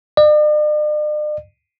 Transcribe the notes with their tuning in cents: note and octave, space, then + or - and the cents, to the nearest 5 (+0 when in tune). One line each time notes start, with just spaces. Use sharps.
D5 +45